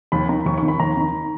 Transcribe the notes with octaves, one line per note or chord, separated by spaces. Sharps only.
D#2 B5
D#3 A#5
D#2 C#6
D#3 C#6
B5
D#2 A#5
D#3